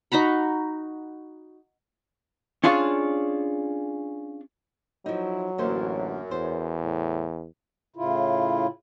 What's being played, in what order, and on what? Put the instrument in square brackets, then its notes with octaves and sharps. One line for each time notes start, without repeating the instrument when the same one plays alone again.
[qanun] D#4 F#4 A#5 B5
[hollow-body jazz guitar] C#4 D4 F4 G#4 C#5
[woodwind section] A2 E4 [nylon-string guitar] F3 D#4 [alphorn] F#3
[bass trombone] A1 [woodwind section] F#2 [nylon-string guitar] D3 A#3 C5
[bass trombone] E2 [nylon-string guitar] C5
[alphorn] A2
[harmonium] A2 C#3 E4 F4